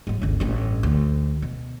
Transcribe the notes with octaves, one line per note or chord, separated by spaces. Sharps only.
G#2 F#3
G1 C#2
A1 G2
D2 D3
B2